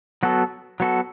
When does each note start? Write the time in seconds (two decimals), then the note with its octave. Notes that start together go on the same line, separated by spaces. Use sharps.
0.23 F#3 B3 F#4 A4
0.80 F#3 B3 F#4 A4